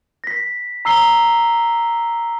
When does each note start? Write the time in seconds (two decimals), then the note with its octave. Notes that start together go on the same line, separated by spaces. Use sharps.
0.24 A#6 B6
0.85 A#5 E6 C7 G7